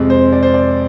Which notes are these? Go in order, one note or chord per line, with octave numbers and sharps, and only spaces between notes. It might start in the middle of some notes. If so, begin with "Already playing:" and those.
Already playing: F2 C3 G#3
C5
D5
C5
D5